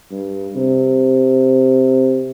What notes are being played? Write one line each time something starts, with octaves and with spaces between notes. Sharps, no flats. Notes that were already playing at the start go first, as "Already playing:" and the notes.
G2
C3